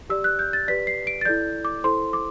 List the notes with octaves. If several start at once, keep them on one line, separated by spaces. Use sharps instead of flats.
G4 D5 E6
F#6
G6
A6
G4 B4 D5 B6
C7
D7
A6
E4 A4 D5 G6
D6
E4 A4 C5 C6
D6